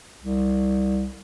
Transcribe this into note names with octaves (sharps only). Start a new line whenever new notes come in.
C2